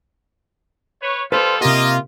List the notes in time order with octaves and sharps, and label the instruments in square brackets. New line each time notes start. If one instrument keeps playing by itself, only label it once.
[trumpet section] B4 C#5
[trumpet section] G3 F4 A4 [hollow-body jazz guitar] B4 C5
[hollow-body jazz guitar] C3 G4 [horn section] A#3 F4 [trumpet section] D#5